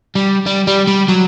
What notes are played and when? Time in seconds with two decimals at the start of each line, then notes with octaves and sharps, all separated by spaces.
0.15 G3
0.46 G3
0.67 G3
0.87 G3
1.08 F#3